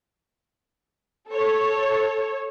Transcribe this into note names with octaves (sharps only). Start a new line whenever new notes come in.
A4 C#5